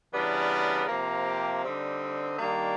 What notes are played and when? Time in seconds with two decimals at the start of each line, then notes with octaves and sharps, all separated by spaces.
0.13 C#3 E3 G3 B3 D4 A#4
0.89 C3 F3 A#3
1.25 G4
1.63 D3 G3 C4 D#4
2.38 D#3 G3 A#3 D4